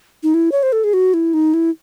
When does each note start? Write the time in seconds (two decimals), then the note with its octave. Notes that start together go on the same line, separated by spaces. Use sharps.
0.23 D#4
0.34 E4
0.52 C#5
0.63 C5
0.73 A4
0.84 G#4
0.94 F#4
1.14 E4
1.34 D#4
1.54 E4